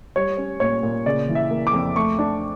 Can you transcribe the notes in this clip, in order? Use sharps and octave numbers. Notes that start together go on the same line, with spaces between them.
G3 C#5
C#4
A#2 C#5
A#2
C#3 D5
E3
E5
A#3
D6
F2
A3 C#6
D4